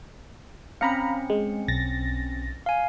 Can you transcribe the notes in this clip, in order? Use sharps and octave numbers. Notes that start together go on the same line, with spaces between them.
C4 C#4 F5 A#5 B5 C#7
G#3
B1 A6 A#6
F5 G#5